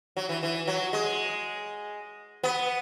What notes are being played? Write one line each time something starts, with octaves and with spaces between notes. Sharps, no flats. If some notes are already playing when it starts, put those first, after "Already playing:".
F#3
E3
E3
F#3
G#3
B3